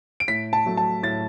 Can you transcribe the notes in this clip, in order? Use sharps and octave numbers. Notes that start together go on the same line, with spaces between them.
D7
A2 B6
A5
F#3 A3
A5
A2 A6